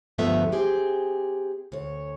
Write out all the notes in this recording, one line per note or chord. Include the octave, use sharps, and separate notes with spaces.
D2 G2 F3 A3 B3 E5
C4 G4 G#4
D2 C#5